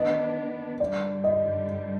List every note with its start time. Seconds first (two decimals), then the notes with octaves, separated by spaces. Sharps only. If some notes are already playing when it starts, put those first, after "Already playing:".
Already playing: D#3 B3 D4 D#5
0.80 G2 D3 G3 D5
1.24 D#5